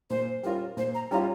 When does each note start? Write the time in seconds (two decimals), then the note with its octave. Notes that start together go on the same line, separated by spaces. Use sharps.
0.10 A#2 C5
0.43 G3 C#4 F4 A#4
0.77 A#2 C5
0.94 A#5
1.11 G3 C#4 F4 A#5